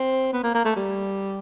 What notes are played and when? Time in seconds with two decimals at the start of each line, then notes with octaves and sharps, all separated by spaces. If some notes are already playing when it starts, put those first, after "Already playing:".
Already playing: C4
0.33 B3
0.43 A#3
0.54 A#3
0.65 A3
0.76 G3